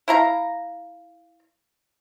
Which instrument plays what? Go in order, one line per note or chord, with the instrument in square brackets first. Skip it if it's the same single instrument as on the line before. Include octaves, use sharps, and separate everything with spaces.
[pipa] E4 F5 A#5